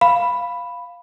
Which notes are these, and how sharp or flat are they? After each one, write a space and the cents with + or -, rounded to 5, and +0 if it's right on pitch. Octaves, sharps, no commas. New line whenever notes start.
F5 +0 B5 +0